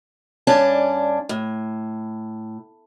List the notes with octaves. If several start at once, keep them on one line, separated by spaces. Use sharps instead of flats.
G2 C#4 D4 A5
A2